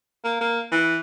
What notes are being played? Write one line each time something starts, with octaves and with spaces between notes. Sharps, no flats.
A#3
A#3
E3